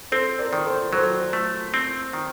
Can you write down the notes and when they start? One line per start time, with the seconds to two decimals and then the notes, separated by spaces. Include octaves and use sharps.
0.12 C4 A4 C5
0.39 A#4 D5
0.53 D#3
0.65 A4 C5
0.92 F#3 A4 C5
1.33 A3
1.74 C4
2.13 D#3